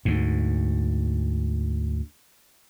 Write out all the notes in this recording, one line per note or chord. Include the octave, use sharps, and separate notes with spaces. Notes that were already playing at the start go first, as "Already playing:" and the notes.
D2 G#2